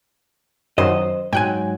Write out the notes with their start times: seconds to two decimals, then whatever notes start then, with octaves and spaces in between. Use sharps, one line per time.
0.78 F#2 D#3 F#3 C5 D#5
1.33 G#2 F#3 G5 G#5 F#6